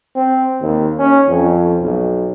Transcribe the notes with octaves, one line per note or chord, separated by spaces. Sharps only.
C4
D#2
C#4
F2
B1